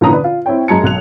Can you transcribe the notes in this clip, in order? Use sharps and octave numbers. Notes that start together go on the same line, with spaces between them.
A#2 D3 E3 C#4 A#5 D#6
B4 D5
F4
C4 E4 C#5 G5
F#2 G#3 A5 A#5 G#6 C#7
B1 F#6 F7